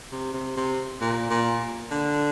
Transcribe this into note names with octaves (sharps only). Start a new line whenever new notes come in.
C3
C3
C3
A#2
A#2
D3